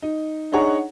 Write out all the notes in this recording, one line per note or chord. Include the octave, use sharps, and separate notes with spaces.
D#4
D4 D#4 G#4 C#5 F#5 A#5